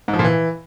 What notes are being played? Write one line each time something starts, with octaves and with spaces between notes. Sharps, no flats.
G#2
F3
A#2
E3